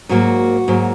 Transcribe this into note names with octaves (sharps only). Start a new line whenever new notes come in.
G#2 F#3 A#3 F#4
G#2 F#3 A#3